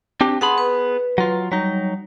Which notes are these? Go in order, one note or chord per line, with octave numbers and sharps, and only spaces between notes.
C4 D4 G4
B3 G#4 F#5 A5 B5 C6
B4
F#3 F4
F#3 G3 D#4